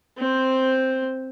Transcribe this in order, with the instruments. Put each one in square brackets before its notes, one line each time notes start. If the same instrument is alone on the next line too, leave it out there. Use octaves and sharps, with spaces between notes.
[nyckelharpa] C4 C5